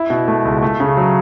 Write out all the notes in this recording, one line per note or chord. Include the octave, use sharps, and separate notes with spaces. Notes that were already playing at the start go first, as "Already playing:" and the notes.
Already playing: E4
B2
A3
C#2
A3
C#3
F#3